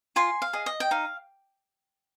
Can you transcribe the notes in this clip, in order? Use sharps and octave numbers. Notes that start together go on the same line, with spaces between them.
F4 G#5 C6
F5
G#4 D#5
D#5
G5
D#4 F5